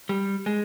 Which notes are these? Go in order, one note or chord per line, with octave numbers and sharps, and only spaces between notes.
G3
G#3